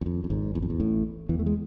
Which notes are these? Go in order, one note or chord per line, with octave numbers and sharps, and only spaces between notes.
E2
F2
F2
G#1 G#2
E2
F2
E2
A1 A2
E2 E3
A3
G#3